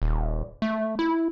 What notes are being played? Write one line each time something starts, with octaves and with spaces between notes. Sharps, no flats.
D#1
A3
E4